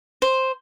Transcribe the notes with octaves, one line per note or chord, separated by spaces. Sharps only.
C5